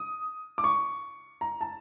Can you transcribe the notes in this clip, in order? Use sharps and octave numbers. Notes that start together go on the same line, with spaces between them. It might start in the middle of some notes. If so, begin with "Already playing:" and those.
Already playing: D#6
D6
C#6
A#5
A5